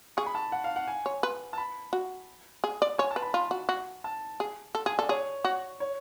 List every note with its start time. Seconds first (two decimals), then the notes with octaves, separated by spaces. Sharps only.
0.17 G#4 C#6
0.26 B5
0.35 A5
0.52 F#5
0.64 F5
0.76 F#5
0.88 G#5
1.06 C#5
1.23 B4
1.53 A5
1.58 B5
1.93 F#4
2.64 G#4
2.82 D5
2.98 C#5 G#5
3.11 A5
3.16 B4
3.22 B5
3.34 F4
3.51 F#4
3.69 F#4
4.04 A5
4.40 G#4
4.75 A4
4.86 G#4 G#5
4.98 A4 D5
5.09 G#4 C#5
5.45 F#4
5.80 C#5